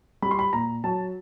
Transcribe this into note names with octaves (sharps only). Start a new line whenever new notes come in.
G3 B5
C6
B5
A#2 A#5
F#3 A5